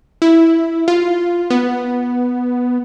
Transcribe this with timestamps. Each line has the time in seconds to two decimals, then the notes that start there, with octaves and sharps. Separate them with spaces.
0.22 E4
0.88 F4
1.50 B3